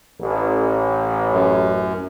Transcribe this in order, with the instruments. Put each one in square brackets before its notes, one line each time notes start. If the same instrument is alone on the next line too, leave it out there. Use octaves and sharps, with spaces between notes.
[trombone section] A1
[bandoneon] F#2